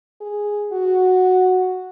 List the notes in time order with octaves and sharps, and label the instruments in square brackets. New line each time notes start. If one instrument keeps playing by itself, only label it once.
[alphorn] G#4
F#4